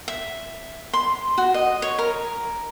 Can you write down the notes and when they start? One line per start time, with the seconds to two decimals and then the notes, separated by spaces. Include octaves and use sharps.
0.08 E5
0.93 C6
1.38 F#4
1.54 D#5
1.82 C#5
1.98 A#4